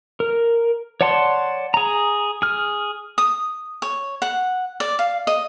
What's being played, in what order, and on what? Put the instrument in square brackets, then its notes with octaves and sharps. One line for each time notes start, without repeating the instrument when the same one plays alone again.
[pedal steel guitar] A#4
C#5 D5 F#5 A5 C6
G#4 A#5
G#4 F6
[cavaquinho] D#6
C#5
F#5
D5
F5
D#5